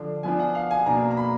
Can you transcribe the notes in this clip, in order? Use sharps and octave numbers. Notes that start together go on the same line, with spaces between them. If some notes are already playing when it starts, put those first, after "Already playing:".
Already playing: D3 F3 D4
F3 B3 D4 G#5
F#5
F5
G#5
B2 A#3 D4 A#5
A#5
B5